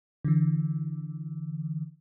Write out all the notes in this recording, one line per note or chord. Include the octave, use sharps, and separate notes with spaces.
D3 E3